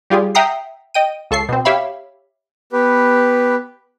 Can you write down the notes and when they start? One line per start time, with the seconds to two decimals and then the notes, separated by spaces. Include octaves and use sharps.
0.10 G3 F4 G4 G#4
0.35 E5 F#5 G5 A#5 D#6 C7
0.94 D#5 G5 D#7
1.31 C#2 A4 C#6 C7
1.49 B2 C4
1.65 G4 C#5 E5 F5 B5
2.72 B3 G4 B4